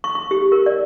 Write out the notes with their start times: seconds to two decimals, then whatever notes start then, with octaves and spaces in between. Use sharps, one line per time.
0.04 C#6
0.15 C#6
0.31 G4
0.52 A#4
0.66 D5